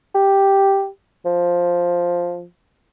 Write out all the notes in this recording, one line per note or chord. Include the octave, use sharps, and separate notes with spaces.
G4
F3